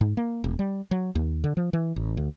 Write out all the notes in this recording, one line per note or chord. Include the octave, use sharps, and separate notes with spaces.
G#2
A#3
E1
G3
F#3
D#2
D3
F3
E3
A1
D2